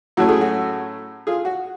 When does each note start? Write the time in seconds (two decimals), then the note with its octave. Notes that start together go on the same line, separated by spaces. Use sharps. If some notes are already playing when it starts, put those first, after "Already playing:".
0.17 A2 F#3 A3 C#4 F#4
0.29 G#4
0.41 F#4
1.27 F4 G#4
1.45 F#4